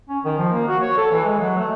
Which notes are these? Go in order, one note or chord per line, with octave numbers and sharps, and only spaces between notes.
C#4
D#3
F3
A#3
F#4
C#5
A4
E3
G#3
F#3
A3